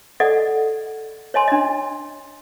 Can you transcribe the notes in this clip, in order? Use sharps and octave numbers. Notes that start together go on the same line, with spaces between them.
A4 D5 D#5 F#5
C#5 D#5 G#5 C6
D4 D#5